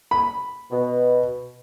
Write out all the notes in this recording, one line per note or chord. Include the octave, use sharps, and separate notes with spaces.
B5
B2